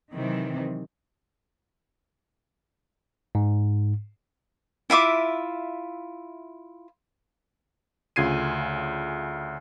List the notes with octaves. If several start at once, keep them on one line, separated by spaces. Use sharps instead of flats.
C3 D#3 E3 F#3 C4
G#2
E4 F4 E5 D6
D2 C#3 F4 G#6 C7 D#7